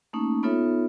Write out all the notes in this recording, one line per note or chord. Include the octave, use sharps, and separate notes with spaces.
A3 A#3 C#4 D#4
B3 D#4 F4 A4 C#5 E5